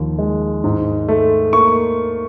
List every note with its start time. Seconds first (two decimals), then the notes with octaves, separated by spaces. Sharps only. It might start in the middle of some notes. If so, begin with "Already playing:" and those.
Already playing: D#2 F3
0.19 G#3
0.64 G#2
1.08 A3
1.53 A#3 C#6